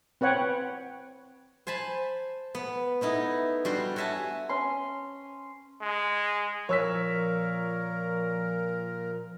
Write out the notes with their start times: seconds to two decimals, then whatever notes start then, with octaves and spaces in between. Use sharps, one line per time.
0.21 C4 B4 C#5 F#5 G5
1.67 C5 G#5 A5 B5
2.55 B3
3.01 A3 B3 D#4 E4
3.65 G3 D4 F#4 C6
3.96 F#4 C#5 E5 G#5 A5
4.49 C#4 C6
5.81 G#3
6.69 A#2 F3 A#4 C#5 E6 B6